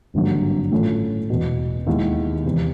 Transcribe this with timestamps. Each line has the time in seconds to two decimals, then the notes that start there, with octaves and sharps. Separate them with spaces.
0.14 G#1 G2 D3 F#3 A#3
0.71 A2 E3 A3 C#4 F4
1.30 E1 E2 B2
1.86 D#2 D#3 G#3 B3 E4
2.45 E2 C3